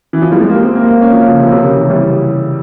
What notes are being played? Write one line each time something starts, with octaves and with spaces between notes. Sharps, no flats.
E3
F3
G3
G#3
A#3
C4
A#3
A#3
C#4
F3
C#3
C3
C3
C#3
E3
G3